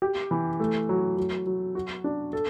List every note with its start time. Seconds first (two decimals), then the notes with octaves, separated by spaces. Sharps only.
0.02 G4
0.31 E3
0.60 A3
0.89 F#3
1.18 F#3
1.46 F#3
1.75 F#4
2.04 D4
2.33 A4